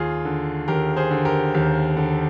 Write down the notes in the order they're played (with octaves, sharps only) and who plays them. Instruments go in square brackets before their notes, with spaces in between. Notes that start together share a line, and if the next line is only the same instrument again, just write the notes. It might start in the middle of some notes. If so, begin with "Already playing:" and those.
Already playing: [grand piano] D#2 F4 G#4
D3
D#2 G4 A#4
G#4 C5
D3
G4 A#4
D#2 G4
D3